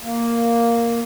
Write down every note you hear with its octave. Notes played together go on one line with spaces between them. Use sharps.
A#3